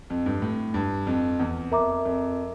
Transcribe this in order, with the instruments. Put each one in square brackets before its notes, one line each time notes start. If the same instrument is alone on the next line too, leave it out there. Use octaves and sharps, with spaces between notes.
[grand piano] F2
G2
A2
G2
F2
E2
[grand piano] F2 [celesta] A#4 E5 A#5 D6
[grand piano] F2